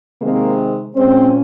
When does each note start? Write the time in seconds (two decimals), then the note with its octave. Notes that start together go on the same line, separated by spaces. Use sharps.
0.20 C3 D#3 G#3 A#3 C4 A#4
0.96 A#2 G#3 C4 C#4 C5